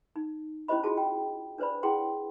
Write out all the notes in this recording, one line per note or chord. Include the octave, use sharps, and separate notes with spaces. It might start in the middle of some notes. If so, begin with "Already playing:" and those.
D#4
C#4 E4 G4 C5 D#5 B5
F4 F#4 G#4 A5
G5
D4 B4 C5 D5 B5
E4 G#4 F#5 G5 C6